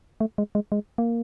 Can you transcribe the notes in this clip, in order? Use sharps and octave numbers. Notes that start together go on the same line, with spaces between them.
A3
G#3
G#3
G#3
A#3